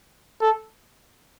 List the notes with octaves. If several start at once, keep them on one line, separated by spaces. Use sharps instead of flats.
A4